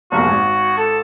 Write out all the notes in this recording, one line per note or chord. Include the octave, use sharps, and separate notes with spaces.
F1 A#1 A#3 F#4
G#1
A4